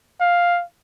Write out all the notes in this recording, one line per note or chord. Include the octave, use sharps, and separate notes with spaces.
F5